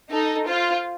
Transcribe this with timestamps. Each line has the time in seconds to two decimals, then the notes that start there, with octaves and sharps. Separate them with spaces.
0.11 D#4 A4
0.47 F4 C5